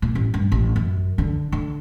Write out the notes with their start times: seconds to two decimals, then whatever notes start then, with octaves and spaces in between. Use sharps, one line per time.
0.02 A#2
0.15 A1
0.34 G2
0.52 A1
0.76 F#2
1.18 D3
1.52 D3